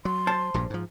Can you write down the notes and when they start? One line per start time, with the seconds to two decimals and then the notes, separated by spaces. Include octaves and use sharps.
0.05 F#3 C6
0.27 C5 A5
0.54 A#1 G2 A#2
0.70 G#2 F3